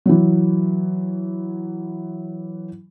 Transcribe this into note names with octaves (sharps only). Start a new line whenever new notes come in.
E3 F#3